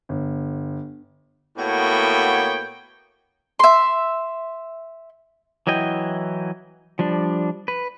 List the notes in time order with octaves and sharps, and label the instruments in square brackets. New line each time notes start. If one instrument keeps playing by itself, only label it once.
[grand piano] G1
[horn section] A2 A#3 B3 F#4 C#5 G5
[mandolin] E5 C6
[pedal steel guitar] E3 F#3 E4 D#5 G5
F3 G3 D4
B4